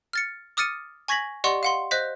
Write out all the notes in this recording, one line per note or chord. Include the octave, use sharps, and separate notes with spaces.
F6 A6 C#7
D6 D#6 F6 A6 C#7 D#7
G#5 C#6 G#6 A#6 B6 F#7
G4 D5 D#5 F#5 C6 C#6
F5 F#5 C6
C5 D#5 F#6 G6 B6